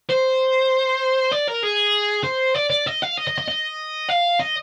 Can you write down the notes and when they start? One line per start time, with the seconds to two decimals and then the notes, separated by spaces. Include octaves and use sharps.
0.09 C5
1.32 D5
1.48 A#4
1.63 G#4
2.24 C5
2.55 D5
2.70 D5
2.86 D#5
3.02 F5
3.17 D#5
3.27 D#5
3.38 D#5
3.48 D#5
4.09 F5
4.40 D#5